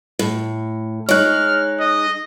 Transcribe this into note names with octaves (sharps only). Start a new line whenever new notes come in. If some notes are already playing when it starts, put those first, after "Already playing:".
A2
G#3 D#4 C#5 F6 F#6
D#5